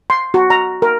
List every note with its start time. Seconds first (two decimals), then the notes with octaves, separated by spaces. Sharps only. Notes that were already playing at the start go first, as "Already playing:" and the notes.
0.10 C6
0.34 F#4
0.50 A#5
0.82 A#4